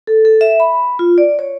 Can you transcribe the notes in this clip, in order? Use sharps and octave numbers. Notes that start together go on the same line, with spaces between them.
A4
A4
E5
B5
F4
D5
C#5